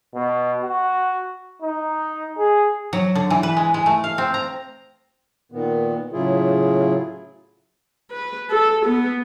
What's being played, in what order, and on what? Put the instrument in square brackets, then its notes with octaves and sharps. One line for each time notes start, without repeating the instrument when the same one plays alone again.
[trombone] B2
F#4
D#4
G#4
[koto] F#3
D3
E3
B4
G#3
G#3
A3
F5
C4
A#5
[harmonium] A#2 D#3 B3
A2 C#3 F#3 E4 F4 G#4
[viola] B4
A4
B3